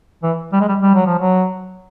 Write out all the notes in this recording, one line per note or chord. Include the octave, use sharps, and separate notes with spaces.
E3
G3
G#3
G3
G3
F#3
F3
F#3